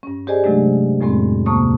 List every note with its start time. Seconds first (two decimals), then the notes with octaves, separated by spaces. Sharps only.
0.03 G2 C#4
0.27 G4 G#4 C5 D5 D#5 G#5
0.44 C3 F#3 G#3 A3 D4
1.01 F2 A2 G#3 B3 C4
1.46 D2 C3 A#3 A5 C#6 D#6